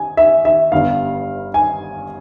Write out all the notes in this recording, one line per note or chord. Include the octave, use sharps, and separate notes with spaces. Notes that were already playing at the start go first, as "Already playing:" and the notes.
Already playing: G#5
E5
E5
G1 G2 G3 F5
G#5